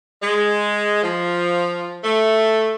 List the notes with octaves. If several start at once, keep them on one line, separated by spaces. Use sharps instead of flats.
G#3
F3
A3